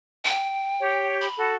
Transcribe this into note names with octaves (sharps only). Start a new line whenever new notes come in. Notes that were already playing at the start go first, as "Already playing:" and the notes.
G5
G4 C#5
B5
F#4 A4